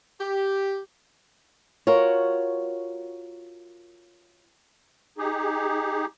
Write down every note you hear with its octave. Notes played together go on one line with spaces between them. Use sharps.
G4
F4 F#4 A#4 C#5
D#4 G4 G#4